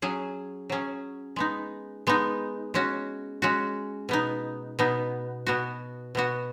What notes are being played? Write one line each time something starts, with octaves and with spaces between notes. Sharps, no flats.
F#3 C#4 G#4
F#3 C#4 G#4
G#3 B3 D#4
G#3 B3 D#4
G#3 C#4 F#4
G#3 C#4 F#4
B2 B3 D#4
B2 B3 D#4
B2 B3 F#4
B2 B3 F#4